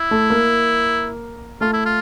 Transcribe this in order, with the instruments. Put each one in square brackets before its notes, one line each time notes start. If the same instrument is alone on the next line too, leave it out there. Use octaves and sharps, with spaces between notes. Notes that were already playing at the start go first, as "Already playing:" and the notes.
Already playing: [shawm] E4
[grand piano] A3
A#3
[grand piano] A3 [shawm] F4
[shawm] E4
F4